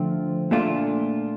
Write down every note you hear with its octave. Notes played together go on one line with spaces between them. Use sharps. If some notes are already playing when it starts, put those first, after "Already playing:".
Already playing: D3 F3 A3 C4 F4
A#2 A3 D4 F4